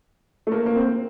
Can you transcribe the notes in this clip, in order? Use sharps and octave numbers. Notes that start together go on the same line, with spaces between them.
A3
A#3
A#3
C4